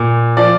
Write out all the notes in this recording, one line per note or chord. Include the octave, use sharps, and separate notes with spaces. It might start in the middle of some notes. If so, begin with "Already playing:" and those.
Already playing: A#2
F3 D5